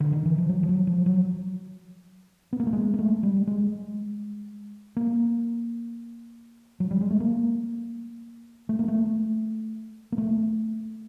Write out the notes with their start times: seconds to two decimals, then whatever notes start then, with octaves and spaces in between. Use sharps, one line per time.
0.00 D3
0.12 D#3
0.26 E3
0.38 F3
0.49 F#3
0.63 F3
0.69 F#3
0.87 F3
1.06 F#3
2.53 B3
2.60 A#3
2.67 A3
2.73 G#3
2.94 A#3
2.99 A3
3.23 G3
3.47 G#3
4.97 A#3
6.80 F#3
6.91 G3
7.01 G#3
7.10 A3
7.20 A#3
8.69 A3
8.79 A#3
8.88 A3
10.12 A#3
10.18 A3